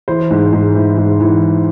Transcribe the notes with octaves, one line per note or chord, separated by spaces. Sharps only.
E3 C5
G#2
G#2
E3
G#2
E3